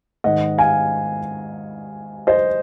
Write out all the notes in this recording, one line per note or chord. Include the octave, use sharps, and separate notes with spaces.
G#2 D#3 D#5 F#5
F5 G#5
C5 D#5